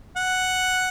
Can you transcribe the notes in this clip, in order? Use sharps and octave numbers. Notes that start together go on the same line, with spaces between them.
F#5